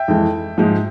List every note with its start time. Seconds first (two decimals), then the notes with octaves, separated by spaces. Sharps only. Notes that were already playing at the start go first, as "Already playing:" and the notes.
Already playing: E5 G5
0.08 F2 E3 G#3
0.57 G#2 F3 G#3